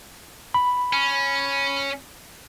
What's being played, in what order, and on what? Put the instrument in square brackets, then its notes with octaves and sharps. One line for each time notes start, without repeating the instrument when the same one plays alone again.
[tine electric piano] B5
[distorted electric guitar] C#4